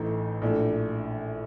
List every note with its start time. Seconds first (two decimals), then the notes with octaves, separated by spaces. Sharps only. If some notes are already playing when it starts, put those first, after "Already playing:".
Already playing: A1 A2 A3 D#4
0.42 A#1 A2 A3 D4